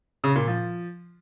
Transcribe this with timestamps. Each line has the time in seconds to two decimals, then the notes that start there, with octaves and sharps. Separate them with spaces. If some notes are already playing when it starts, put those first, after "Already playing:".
0.24 C#3
0.36 A#2
0.47 F3